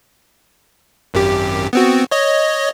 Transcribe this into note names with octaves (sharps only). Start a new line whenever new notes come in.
G#1 F#2 G4
B3 C4 F#4
C#5 D#5